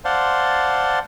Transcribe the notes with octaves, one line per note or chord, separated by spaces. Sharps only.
C5 D5 F5 F#5 A5 C6